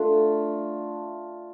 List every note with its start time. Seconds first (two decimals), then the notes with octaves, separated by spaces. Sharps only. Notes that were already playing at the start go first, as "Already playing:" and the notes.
Already playing: A3 D4 F4